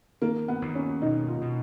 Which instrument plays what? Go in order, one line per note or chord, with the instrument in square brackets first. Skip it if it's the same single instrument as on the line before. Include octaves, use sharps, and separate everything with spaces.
[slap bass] D#3 [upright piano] A#3
[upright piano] B3
[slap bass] D#2
[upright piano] C#4
[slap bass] B2 [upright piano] D#4
[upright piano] F4
[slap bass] B2